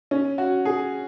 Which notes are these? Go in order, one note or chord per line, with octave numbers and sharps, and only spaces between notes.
C#4
F#4
G#4